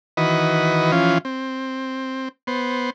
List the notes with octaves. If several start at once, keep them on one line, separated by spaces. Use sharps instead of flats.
D#3 E3 F#4 B4 D#5
E3 F3 C#4 F4
C4
B3 C5